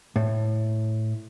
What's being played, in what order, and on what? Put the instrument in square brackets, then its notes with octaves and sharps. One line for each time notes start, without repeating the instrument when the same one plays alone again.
[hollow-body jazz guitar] A2